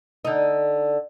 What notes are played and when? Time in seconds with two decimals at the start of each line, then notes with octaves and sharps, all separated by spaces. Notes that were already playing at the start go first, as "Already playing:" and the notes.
0.25 D3 D#4